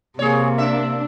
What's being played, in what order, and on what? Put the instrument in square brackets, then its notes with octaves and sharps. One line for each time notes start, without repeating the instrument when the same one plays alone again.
[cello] C3 [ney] A#3 [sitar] G#4 C#5
[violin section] D4 [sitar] E5